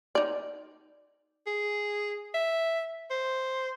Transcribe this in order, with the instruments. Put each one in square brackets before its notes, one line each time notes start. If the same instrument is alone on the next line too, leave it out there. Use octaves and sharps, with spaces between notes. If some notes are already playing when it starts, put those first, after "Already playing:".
[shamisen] D#4 D5
[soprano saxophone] G#4
E5
C5